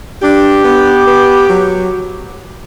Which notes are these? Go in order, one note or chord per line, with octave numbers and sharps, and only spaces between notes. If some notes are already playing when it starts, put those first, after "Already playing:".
D4 G4
B3
B3
F#3